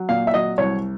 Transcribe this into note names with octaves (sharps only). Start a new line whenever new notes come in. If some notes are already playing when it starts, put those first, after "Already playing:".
Already playing: F#3
A#2 F5
E5
F#3 D#5
C2 C#5